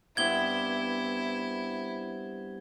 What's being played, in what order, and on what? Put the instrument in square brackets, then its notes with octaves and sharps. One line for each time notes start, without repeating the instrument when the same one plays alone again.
[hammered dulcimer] G2 B3 C4 [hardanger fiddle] E4 [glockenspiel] G#6 G7